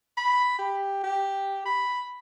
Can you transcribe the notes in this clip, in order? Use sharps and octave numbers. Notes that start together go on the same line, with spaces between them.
B5
G4
G4
B5